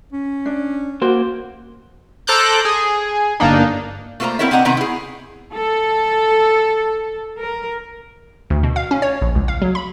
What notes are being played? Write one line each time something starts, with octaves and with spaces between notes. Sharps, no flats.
C#4
D4
A#3 F#4 C5
A4 C5 A#5 D6 F#6 G6
G#4
G1 A#3 D4 D#4
A3 A#3 F4 B4 C5 A#5
B3 C4 E4 A#4 C#5 E5
C4 D4 D#5 F#5 A#5
C3 D#3 B3 C4 D#4 A#5
E4 G#4
A4
A#4
D2
B2
F5
C#4
C#5
A#1
C#2
F5
F#3
B5